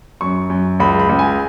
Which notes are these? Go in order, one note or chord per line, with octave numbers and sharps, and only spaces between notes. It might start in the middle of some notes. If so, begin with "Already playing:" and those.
F#2 C#6
F#2
C#2 B5
B5
C#2
G#5